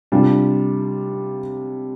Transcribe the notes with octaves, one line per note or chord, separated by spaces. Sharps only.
C3 G3 D4 F4